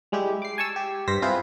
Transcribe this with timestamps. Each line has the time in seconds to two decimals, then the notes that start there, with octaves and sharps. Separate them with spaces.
0.12 G3 G#3 E4 G4
0.42 D6 C7
0.58 G#5 A5 C#6 E6
0.76 G4
1.08 G2 C5 A#6 B6
1.22 C4 E4 F4 G#4 B4 C5